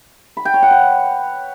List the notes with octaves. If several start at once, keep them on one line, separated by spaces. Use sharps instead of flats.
B5
G5
C#5
F#5
B4